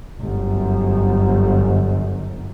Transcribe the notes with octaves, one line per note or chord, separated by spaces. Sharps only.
G1 F#2